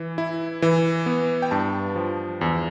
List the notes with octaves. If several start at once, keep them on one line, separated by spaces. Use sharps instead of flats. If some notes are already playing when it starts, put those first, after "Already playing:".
Already playing: E3
E4
E3
B3
G5
G2 A5
F3
E2